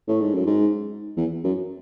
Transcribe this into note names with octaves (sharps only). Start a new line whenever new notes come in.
A2
G#2
F#2
G#2
E2
F#2